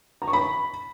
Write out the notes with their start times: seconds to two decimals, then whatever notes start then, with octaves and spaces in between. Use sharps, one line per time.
0.22 A#5
0.28 C#6
0.33 B5